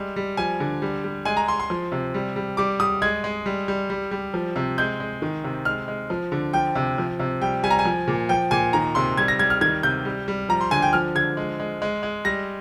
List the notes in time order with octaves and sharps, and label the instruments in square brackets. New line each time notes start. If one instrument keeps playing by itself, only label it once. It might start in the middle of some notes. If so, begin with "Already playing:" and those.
Already playing: [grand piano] G3 G#3
G3
F3 G#5
D3
G3
G3
G#3 G#5
A#5
G#3 C6
C6
F3
C3
G3
G3
G3 D6
G3 D#6
G#3 G#6
G#3
G3
G3
G3
G3
F3
C3
G#3 G6
G#3
D#3
C3
G#3 F6
G#3
F3
D3
F3 G5
C3
F3
C3
G3 G5
G3 G#5
A#5
G#5
F3
A#2
F3 G5
A#2 G#5
D#3 A#5
C3 C6
G3 G#6
A#6
G3 G#6
F6
D#3 G#6
C3 G6
G3
G3
F3 A#5
C6
D3 G#5
G5
F3 F6
D3 G#6
G#3
G#3
G#3
G#3
G3 A#6